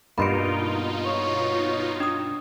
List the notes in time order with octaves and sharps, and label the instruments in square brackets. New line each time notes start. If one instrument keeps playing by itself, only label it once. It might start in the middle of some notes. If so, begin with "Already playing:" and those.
[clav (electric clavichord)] G2 A#3 [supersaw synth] B2 D#4 F4 [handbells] B5 C6 D7
[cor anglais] C#5
[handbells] D4 D#6